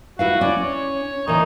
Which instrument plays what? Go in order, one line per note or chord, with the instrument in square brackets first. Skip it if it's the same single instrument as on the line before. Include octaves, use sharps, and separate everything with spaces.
[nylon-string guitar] E4 B4 F5 [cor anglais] F#4
[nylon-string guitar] C#4 [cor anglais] D5
[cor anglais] C#5
[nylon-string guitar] A#2 E3 [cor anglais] D#4